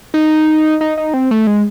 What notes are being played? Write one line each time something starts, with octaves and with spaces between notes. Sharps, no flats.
D#4
D#4
D#4
C4
A3
G#3